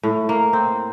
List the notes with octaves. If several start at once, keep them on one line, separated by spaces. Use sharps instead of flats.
A2
A#3
C4